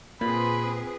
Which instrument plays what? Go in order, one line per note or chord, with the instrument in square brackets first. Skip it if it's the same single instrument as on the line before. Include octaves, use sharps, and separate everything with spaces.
[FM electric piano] A#2 [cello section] C4 G#4 B4 [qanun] F4 [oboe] B5